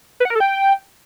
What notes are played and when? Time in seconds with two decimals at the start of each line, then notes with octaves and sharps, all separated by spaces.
0.20 B4
0.25 F#5
0.30 A#4
0.35 A4
0.40 G5